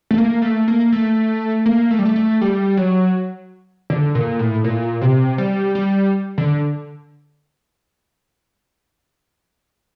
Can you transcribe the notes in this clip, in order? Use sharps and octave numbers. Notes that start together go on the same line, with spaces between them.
A3
A#3
A3
A#3
A3
A#3
A3
G3
A3
A3
G3
F#3
D3
A#2
A2
A#2
C3
G3
G3
D3